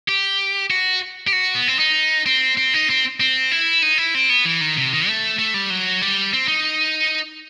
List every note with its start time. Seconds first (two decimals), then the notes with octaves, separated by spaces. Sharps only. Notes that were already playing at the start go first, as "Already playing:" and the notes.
0.08 G4
0.71 F#4
1.27 G4
1.33 F#4
1.55 B3
1.67 C4
1.79 D#4
2.26 C4
2.57 C4
2.74 D#4
2.90 C4
3.20 C4
3.51 E4
3.82 D#4
3.98 E4
4.15 C4
4.30 B3
4.45 E3
4.61 D#3
4.77 C3
4.93 D#3
5.07 A3
5.39 A3
5.54 G3
5.70 F#3
6.02 G3
6.33 C4
6.48 D#4